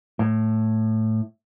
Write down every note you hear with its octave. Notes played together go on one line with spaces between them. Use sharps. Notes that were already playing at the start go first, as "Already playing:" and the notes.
A2